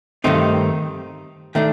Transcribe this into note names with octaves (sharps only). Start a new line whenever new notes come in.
G2 D#3 A3 C4 D#4
D#3 A3 D4